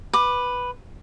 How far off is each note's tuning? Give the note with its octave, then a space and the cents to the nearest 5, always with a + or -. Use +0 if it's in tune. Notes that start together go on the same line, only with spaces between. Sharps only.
B4 +0 D6 +20